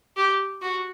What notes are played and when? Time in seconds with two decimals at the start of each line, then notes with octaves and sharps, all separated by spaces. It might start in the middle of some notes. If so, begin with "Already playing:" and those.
0.17 G4
0.62 F#4